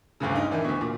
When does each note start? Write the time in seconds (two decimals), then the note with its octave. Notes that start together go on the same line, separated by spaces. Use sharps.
0.20 G1 D2 G2 C#3
0.35 D#4
0.50 D#3 E3 D4
0.64 D2 B2
0.81 A#2